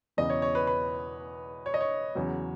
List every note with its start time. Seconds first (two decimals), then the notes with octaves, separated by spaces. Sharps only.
0.17 E1 E2 C#3 E3 D#5
0.30 C#5
0.42 C#5
0.55 B4
0.67 B4
1.66 C#5
1.74 D#5
1.81 C#5
2.15 E2 C#3 F#3